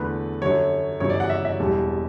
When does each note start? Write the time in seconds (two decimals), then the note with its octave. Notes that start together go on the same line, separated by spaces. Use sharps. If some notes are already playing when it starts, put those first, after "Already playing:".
Already playing: E2 D3 A3 B4
0.42 F#2 D3 F#3 C#5
1.00 G1 F#2 C#3 E3 C#5
1.10 D5
1.20 F#5
1.30 E5
1.45 E5
1.59 E1 E2 B2 G3